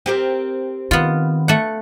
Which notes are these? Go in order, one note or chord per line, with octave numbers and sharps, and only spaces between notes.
C4 G4 A#4
D#3 B3 F4
A3 F#5